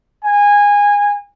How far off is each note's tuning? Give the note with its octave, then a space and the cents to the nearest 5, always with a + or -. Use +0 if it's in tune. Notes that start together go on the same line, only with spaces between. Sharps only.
G#5 -20